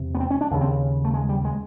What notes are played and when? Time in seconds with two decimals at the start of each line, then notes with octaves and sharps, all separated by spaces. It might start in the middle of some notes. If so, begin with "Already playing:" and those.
Already playing: E2 C3
0.15 B3
0.20 C4
0.30 C#4
0.41 D4
0.51 D#2 C#3
0.61 C4
1.05 A3
1.14 G#3
1.29 G3
1.45 G#3